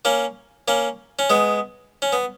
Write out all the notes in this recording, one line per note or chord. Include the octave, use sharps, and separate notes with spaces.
A#3 C#4
A#3 C#4
C#4
G#3 B3
C#4
B3